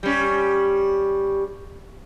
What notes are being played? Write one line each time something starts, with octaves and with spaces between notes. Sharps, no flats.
G3 C#4